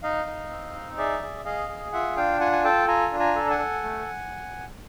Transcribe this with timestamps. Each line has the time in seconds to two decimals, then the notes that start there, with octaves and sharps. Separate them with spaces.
0.02 D#4 D#5 F5
0.27 D#4
0.50 C4
0.74 D#4
0.98 G#4 D5 E5
1.22 G#4
1.45 G#4 D#5 F5
1.69 G#4
1.92 F4 E5 F#5
2.16 D4 F5 G5
2.40 F4 F#5 G#5
2.52 G#5
2.64 A4 G5 A5
2.87 F4 G#5 A#5
3.11 D4
3.20 G#5 A#5
3.36 A4
3.50 F#5 G#5
3.59 A4
3.83 A3